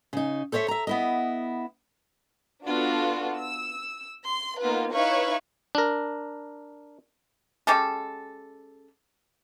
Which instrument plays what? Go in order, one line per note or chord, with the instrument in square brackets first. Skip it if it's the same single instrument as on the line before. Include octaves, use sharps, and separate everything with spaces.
[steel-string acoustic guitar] C#3 D#4
A4 C5 C#5 D#5 E5
E5 A#5
B3 E4 D#5
[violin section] B3 D4 F4 F#4 A4
E6
C6
A#3 B3 D#4 F4 B4
D#4 E4 B4 C#5 F5 C#6
[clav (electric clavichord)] D4 A#4
[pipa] G#3 C#4 G4 A4